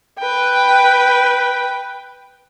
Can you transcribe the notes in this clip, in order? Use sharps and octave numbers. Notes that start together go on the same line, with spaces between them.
B4 G5